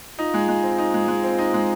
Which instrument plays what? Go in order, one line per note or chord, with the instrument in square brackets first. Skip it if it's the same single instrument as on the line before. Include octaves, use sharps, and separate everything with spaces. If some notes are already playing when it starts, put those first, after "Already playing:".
[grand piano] D#4 [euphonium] F4
[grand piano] G#3
G#3
C4
D#4
G#3
G#3
C4
D#4
G#3